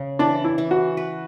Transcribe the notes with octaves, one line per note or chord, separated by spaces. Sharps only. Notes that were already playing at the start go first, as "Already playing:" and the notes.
Already playing: C#3
E3 D4
E4
E3
F#4
B4